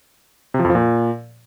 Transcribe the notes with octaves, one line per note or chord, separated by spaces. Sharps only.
C3
F3
F2
F3
A#2